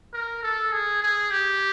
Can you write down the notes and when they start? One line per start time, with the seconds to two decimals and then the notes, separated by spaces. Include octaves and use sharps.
0.13 A#4
0.43 A4
0.72 G#4
1.02 G#4
1.31 G4